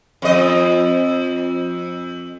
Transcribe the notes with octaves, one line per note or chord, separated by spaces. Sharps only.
F2 D#5